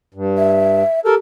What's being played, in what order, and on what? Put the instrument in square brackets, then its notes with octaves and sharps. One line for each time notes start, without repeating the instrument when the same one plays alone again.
[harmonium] G2
[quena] E5
[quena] G4 [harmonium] A4 A#4